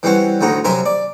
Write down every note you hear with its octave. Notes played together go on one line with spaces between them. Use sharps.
E3 G3 C4 C#4 F#4
D2 A2 D#4 F#4
F#2 C3 A#4 E5 G#5 C6
D5